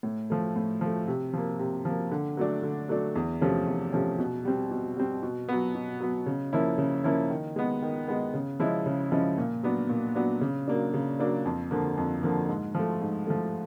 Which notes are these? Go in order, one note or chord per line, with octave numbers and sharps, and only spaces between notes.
A2
F3 A3
A2
F3 A3
C3
F3 A#3
C3
F3 A#3
D3
F#3 A3 D4
D3
F#3 A3 D4
E2
C3 F3 A3 C#4
E2
C3 F3 A3 C#4
B2
G3 C4
B2
G3 C4
B2
F#3 B3
B2
F#3 B3
C#3
F3 A#3 C#4 E4
C#3
F3 A#3 C#4 E4
D#3
G#3 B3
D#3
G#3 B3
C#3
F3 G#3 C#4 E4
C#3
F3 G#3 C#4 E4
A#2
F#3 B3 D4
A#2
F#3 B3 D4
C#3
F#3 A#3 D4
C#3
F#3 A#3 D4
F2
D3 F3 A#3
F2
D3 F3 A#3
G#2
F3 A3
G#2
F3 A3